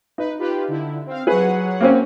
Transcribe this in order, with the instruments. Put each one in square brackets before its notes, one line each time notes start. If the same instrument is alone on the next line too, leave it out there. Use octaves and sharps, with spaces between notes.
[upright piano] D#4 [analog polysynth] B4
[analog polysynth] F4 G4 B4
D3 E4
C4 F5
[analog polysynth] F#3 C#5 F#5 [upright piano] G#4 B4
[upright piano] A#3 C4 C#4